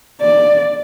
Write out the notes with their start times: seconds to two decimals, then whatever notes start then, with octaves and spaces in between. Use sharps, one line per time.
0.22 D5